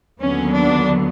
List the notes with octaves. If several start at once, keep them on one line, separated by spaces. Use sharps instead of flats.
D#2 D3 F#3 B3 C#4
D4